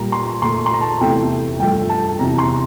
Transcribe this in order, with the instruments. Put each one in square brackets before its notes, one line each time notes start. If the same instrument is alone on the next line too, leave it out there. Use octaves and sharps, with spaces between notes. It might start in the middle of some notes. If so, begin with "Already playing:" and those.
Already playing: [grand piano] A#2 G3 A#3 A#5
C6
A#2 A3 C6
C6
A#5
A5
E2 C3 E3 A3 G5
G2 F3 A3 G5
A5
E2 C3 E3 A#5
C6